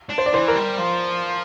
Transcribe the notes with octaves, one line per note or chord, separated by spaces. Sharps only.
D4
C5
D5
E3 C5
A#4
G3
F3